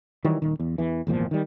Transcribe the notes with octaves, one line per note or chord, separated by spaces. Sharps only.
D#3 E3 F#3 G3
D#1 D#3
E2
E2 E3
G#1 E2 A#2 F3
D#3 G3